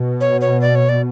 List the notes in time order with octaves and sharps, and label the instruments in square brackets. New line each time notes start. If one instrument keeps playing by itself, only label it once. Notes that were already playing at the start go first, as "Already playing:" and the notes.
Already playing: [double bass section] B2
[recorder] C#5
C#5
D5
C#5
D5